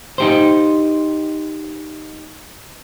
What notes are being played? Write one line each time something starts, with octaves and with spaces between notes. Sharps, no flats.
D#4 G4 C5